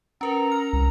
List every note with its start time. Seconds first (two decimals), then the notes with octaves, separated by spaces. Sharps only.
0.21 C#4 A#4 B4 A#5
0.52 F6
0.73 C2